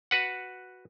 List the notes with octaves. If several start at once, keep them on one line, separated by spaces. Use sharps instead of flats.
F#4 B4 F#5